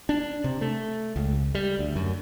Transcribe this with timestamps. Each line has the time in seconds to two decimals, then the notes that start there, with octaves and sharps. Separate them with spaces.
0.09 D4
0.44 C3
0.61 A3
1.16 C#2
1.55 G3
1.79 D2
1.96 F#2